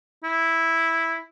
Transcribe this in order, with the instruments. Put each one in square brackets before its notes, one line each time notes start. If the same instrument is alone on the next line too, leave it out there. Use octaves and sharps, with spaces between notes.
[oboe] E4